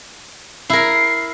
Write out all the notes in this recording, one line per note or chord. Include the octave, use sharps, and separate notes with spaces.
E4 A#4 C7